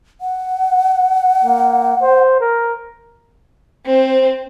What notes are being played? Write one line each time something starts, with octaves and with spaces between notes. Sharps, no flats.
F#5
A#3
C5
A#4
C4 C5